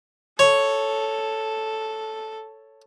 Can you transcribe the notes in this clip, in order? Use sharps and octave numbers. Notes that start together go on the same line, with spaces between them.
A4 C#5